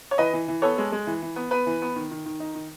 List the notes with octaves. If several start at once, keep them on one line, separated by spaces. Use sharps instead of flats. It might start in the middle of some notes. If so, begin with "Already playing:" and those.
C#5
E3 B4 D#5
E3
E3
B3 A4 C#5
G#3
G#3
E3
E3
B3
B3 B4
E3
B3
D#3
D#3
D#3
D#4
D#3